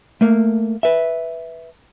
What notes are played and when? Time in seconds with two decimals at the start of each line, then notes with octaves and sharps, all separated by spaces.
0.21 A3 A#3
0.83 B4 E5